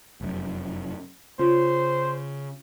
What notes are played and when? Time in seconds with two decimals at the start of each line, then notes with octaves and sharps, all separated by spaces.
0.21 F1 F#2
1.39 C#3 F4 C5